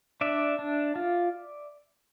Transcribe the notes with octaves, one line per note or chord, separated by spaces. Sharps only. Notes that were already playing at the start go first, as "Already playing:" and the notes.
D4 D5 E5
D4
F4